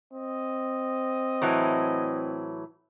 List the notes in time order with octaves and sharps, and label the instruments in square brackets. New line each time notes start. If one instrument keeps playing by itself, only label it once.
[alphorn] C4 [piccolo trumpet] D#5
[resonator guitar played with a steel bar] A2 E3 F#3